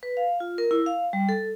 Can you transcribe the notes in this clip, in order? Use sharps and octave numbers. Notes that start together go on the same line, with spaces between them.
B4
F5
F4
A#4
E4
F5
G3
A4